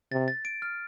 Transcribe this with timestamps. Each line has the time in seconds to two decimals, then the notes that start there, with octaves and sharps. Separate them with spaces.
0.12 C3 A6
0.28 A6
0.45 D7
0.62 F6